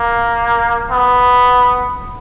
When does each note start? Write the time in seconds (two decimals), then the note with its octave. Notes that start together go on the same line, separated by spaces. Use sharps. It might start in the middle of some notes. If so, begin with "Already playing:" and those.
Already playing: A#3
0.91 B3